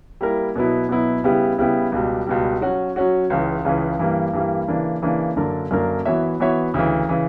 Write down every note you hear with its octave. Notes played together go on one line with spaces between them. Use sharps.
G3 A#3 E4 A#4
B2 F#3 B3 E4
B2 F#3 B3 E4
C#3 G3 B3 E4 G4
C#3 G3 B3 E4 G4
C#2 B2 G3
C#2 B2 G3
F#3 C#4 F#4
F#3 C#4 F#4
C#2 C#3 E3
C#2 C#3 E3
G2 E3 G3 A#3
G2 E3 G3 A#3
C#3 E3 A#3 D4
C#3 E3 A#3 D4
F#2 D3 A#3 D4 A#4
F#2 D3 A#3 D4 A#4
E3 B3 F#4 C#5 E5
E3 B3 F#4 C#5 E5
D2 C#3 E3
C#3 E3